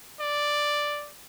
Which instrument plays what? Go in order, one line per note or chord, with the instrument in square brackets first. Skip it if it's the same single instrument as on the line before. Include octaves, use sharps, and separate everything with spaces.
[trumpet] D5